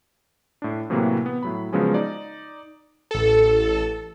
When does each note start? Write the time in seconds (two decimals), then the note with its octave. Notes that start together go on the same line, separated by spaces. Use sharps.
0.62 A2 D4
0.90 A2 C3 E3 F#3 A#3
1.26 B3
1.43 A2 F#3 B5
1.72 C#3 F3 F#3 G#3 B3 C#4
1.94 D#4 D5
3.11 A1 A4